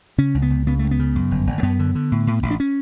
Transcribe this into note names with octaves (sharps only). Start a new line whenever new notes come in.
C#3 C#4
C#2
B3
C#2
C#3 B3
C#2 A3
B3
C#3
F#2
G1
G1
A3
F#2 B3
D3
D3
A2
A2
A1
D4
C#4